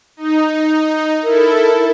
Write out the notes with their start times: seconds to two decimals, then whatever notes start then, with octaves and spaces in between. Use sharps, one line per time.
0.17 D#4
1.24 E4 A4 A#4